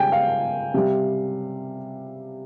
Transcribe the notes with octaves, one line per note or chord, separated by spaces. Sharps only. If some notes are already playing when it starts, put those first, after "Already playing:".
Already playing: C#3 G3 G5 G#5
F5
C3 G3